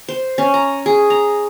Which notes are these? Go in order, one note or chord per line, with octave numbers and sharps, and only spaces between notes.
C5
C#4
A#5
G#4
A#5